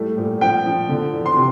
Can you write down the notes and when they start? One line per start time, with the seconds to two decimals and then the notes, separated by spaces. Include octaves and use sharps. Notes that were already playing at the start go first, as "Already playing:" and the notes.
Already playing: A2 G3 A3
0.18 A#2
0.41 F3 G5
0.66 F3
0.89 D3
1.13 E2
1.26 C6
1.36 C3